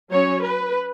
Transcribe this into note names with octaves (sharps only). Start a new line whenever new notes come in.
F#3 C#4 C#5
B4